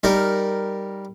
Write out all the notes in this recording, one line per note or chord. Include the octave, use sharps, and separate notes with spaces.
G3 D#4 A#4